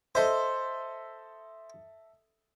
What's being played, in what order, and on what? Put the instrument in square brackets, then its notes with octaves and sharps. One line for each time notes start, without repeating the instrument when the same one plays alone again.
[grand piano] A4 D#5 E5 [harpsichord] C5